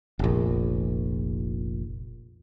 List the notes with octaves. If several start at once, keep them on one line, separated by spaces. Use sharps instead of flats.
F1 A#1